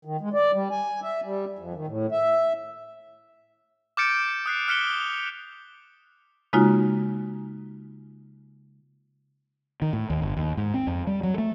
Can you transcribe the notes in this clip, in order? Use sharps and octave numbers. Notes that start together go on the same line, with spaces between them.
D#3
G#3
D5
G3
G#5
E5
G3
F2
D#3
A2
E5
D6 F6 G6 A6 C#7 D7
C#7
D#6 F#6 C7
F6 F#6 B6 C#7 E7 G7
F7
C#3 G#3 A#3 D#4 F4 F#4
D#3
A2
D#2
G1
D#2
G#2
C4
F2
G3
F#3
A3